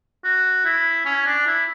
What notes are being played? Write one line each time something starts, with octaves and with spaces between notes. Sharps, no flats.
F#4
E4
C#4
D4
E4